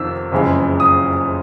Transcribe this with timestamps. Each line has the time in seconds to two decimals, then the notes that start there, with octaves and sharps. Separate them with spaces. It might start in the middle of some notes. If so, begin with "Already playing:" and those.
Already playing: F2 C3 D#3 E6
0.32 F#1 F2 C#3 E3 G#3
0.80 D#6